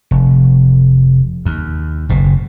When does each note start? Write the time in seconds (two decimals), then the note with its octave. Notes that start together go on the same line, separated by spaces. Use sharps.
0.11 F1
1.46 D#2
2.09 F#1 B2